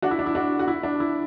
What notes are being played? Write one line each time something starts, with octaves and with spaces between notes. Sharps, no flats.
D4 F#4
E4
D4
E4
D4 F#4
F#4
E4
D4
E4